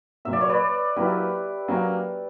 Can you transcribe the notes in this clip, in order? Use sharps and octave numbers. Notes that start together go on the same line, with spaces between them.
A#2 F#3 A#3 E5
D5
C#5
B4 D5
F#3 A#3 E4 G4 B4
F#3 A#3 C#4